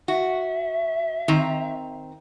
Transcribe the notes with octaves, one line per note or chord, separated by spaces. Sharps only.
F#4 E5
D#3 C4 A#5